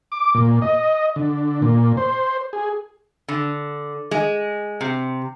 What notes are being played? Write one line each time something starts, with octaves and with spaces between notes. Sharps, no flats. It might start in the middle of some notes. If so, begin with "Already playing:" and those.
D6
A#2
D#5
D3
A#2
C5
G#4
D3
G#3
C3